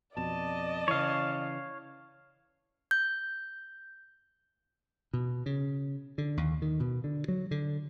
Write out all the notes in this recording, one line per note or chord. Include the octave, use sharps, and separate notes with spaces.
F2 B2 D5 D#5 A5
C#3 E3 C#5 F5
G6
B2
C#3
D3
D#2
D#3
B2
D3
F#3
D3